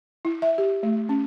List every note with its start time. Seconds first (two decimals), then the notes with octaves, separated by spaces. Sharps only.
0.25 E4
0.42 E5
0.58 G4
0.83 A3
1.09 C#4